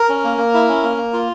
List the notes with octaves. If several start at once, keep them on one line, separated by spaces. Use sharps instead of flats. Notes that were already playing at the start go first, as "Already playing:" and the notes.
Already playing: A#4
C#4
A#3
A#3
E4
C#4
A#3
A#3
F4